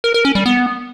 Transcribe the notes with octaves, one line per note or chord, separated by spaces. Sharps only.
A#4
A#4
C#4
G3
B3